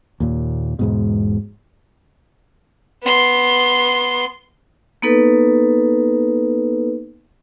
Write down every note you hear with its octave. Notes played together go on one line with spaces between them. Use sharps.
D#2 A#2
E1 G#2 B2
B3 C6
A#3 B3 D#4 A4 B4